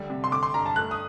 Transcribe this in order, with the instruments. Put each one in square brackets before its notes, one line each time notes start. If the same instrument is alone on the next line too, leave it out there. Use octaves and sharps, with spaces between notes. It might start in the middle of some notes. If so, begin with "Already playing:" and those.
Already playing: [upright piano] D3 G3
C3
C6
D3 D6
C6
G2 A#5
A5
A3 F#6
D#6